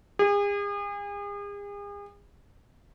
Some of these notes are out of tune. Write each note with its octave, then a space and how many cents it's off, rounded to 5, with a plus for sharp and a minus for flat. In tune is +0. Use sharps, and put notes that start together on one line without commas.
G#4 -40